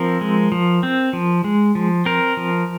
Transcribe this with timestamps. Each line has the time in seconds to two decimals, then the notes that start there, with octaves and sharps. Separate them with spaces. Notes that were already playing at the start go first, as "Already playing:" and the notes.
Already playing: F3 C4 A#4
0.21 G#3
0.52 F3
0.83 C4
1.13 F3
1.44 G#3
1.75 F3
2.05 C4 A#4
2.37 F3